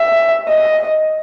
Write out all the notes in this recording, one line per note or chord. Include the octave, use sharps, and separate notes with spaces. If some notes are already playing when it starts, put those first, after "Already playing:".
Already playing: E5
D#5